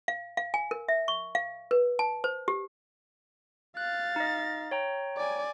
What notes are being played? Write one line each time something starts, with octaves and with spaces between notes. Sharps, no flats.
F5
F5
G#5
A#4
E5
C#6
F5
B4
A5
C5
G4
F5 F#6 A6
D#4 D#5
C#5 G5 A#5
D5 G#5